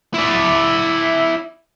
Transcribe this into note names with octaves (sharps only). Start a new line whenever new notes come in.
E4 D5